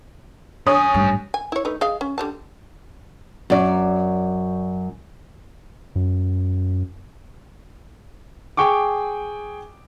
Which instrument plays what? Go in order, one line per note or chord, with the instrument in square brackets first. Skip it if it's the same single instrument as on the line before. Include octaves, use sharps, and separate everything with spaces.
[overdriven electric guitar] F#2 G#5 [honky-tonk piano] C#5 D#6
[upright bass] A1 G2
[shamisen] G#5
E4 C#5
A3 D#4 B4
G#4 D#5 F5
C#4
D3 G3 A5
[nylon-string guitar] F#2 D5
[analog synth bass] F#2
[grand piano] G#4 G5 C#6 D6